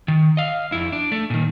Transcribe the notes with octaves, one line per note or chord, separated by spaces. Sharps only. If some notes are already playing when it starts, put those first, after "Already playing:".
D#3
D#5 F5
F2 E4
D4
A3
A#2 D#3